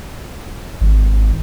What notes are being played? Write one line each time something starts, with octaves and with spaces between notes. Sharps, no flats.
G#1